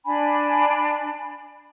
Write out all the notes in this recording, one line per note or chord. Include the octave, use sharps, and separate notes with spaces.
D4 G#5 B5